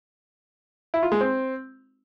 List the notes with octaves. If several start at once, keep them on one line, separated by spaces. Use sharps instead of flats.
E4
F4
G#3
C4